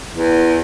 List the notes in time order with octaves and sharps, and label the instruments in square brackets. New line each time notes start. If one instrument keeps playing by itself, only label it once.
[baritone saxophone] E2